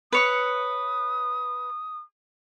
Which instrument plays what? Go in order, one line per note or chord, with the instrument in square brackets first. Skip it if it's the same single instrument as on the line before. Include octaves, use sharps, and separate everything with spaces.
[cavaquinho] B4 C#5 C#6 [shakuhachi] D#6